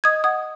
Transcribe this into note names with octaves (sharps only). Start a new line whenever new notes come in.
D#5 D#6 G#6
F#5 D#6 G#6